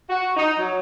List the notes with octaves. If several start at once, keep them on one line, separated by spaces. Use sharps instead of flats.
F#4
D#4
F#3